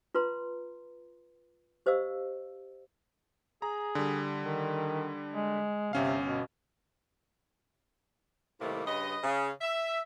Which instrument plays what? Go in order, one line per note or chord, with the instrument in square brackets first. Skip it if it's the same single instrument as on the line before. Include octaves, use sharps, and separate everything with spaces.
[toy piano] F4 B4 A#5 C6
G4 C5 D#5 F5 E6
[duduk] G#4 [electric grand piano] A#5
[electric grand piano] D3 G3
[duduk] D#3
G#3
[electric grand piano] G1 C#4 F5 [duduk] C3
[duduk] B2
[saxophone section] A2 C3 D#3 G3 A3 A#3
G2 C#3 B4 D#5
C#3
E5